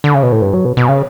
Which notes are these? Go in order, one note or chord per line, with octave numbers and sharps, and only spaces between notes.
D3
C#3
B2
A2
G2
F#3
B2
B2
C#3